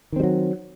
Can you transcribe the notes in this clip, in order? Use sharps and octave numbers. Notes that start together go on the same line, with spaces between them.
D#3 F#3 G3 C4